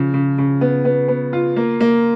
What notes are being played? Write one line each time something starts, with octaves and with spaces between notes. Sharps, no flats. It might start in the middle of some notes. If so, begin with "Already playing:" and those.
Already playing: C#3 F3
C#3
C#3
B3
B3
B3
F4
A#3
A#3